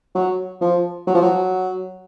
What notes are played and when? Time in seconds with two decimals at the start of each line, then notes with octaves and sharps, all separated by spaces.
0.15 F#3
0.61 F3
1.07 F#3
1.14 F3
1.21 F#3